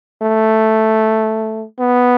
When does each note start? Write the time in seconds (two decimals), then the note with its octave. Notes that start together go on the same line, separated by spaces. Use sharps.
0.22 A3
1.80 B3